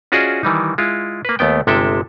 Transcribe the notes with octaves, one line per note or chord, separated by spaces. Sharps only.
C#4 F4 F#4 G#4 D5 D#5
D#3 E3 G3 D#4
G#3 E4 F4
A#3 B4
D#2 A3 B3 G5
G1 C3 G#3 A4 E5 G5